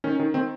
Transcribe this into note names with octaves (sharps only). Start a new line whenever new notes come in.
D#3 C#4
D#3
D#3 C4